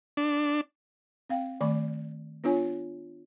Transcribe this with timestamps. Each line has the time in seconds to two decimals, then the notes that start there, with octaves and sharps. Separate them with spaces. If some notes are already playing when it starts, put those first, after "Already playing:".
0.17 D4
1.30 C4 F5 G5
1.61 D#3 A3 D5 B5 D6
2.44 B3 D4 F4 C#5 G#5